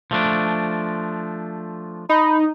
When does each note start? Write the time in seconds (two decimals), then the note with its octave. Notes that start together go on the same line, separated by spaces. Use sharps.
0.11 F3 A3 D4
2.09 D#4 B5